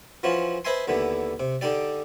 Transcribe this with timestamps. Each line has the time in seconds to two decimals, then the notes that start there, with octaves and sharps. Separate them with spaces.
0.23 E3 F3 C#4 F4 F#4
0.65 B4 C5 D#5 E5 G#5 C6
0.88 D#2 D3 E3 B3
1.40 C3
1.61 D3 D4 D#4 G4 D5